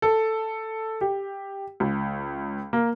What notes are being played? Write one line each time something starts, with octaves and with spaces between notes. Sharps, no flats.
A4
G4
C#2
A#3